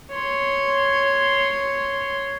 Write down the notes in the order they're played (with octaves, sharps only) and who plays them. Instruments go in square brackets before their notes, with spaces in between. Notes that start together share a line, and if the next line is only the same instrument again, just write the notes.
[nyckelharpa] C#5 C6